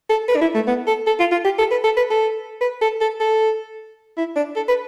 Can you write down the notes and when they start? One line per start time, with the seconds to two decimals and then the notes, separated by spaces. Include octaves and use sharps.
0.09 A4
0.28 B4
0.36 D4
0.41 E4
0.54 A3
0.67 B3
0.87 A4
1.07 A4
1.19 F4
1.31 F4
1.45 G4
1.58 A4
1.71 B4
1.84 A4
1.97 B4
2.10 A4
2.61 B4
2.81 A4
3.01 A4
3.20 A4
4.17 E4
4.36 D4
4.56 A4
4.68 B4